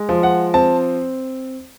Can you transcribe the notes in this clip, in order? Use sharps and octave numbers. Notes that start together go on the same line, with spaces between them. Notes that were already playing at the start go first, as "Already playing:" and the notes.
Already playing: G#3
F3
F#5
C4 A5